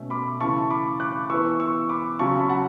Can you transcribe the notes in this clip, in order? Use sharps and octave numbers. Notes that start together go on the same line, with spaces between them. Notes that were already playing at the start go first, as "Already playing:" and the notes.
Already playing: B2 A3 C#4
B5 D6
C#3 E3 A3 A5 C#6
B5 D6
D6 F#6
E3 B3 C#6 E6
C#6 E6
B5 D6
C#3 F#3 C#4 A5 C#6
B5
F#5 A5